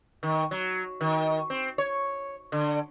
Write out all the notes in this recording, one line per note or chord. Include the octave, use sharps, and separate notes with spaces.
D#3
F#3
D#3
C4
C#5
D3